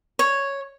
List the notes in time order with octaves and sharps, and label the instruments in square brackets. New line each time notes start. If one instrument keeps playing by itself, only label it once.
[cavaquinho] C#5